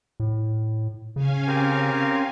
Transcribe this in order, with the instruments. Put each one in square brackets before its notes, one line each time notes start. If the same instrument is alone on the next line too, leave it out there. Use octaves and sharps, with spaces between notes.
[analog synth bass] A2
[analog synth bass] C#3 [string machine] C#4 F5 G#5
[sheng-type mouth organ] C4 G4 A#4